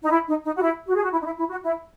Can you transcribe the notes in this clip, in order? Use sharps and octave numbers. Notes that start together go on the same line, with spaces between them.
D#4
E4
D#4
D#4
F#4
E4
F#4
G#4
F#4
E4
D#4
E4
E4
F#4
E4